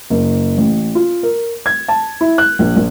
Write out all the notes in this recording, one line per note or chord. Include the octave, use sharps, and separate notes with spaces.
F#1
A1
F4
A#4
G#6
A5
E4
F#6
A#1
A#1